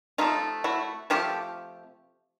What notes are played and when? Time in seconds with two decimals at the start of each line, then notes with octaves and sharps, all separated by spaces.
0.18 C3 F3 A3 D#4 F4
0.64 E4 F#4
1.10 C3 F3 A3 F4 G4